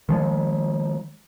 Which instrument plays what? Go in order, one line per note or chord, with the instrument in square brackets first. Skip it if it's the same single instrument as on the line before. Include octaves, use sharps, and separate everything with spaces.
[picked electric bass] D#3 F3 G#3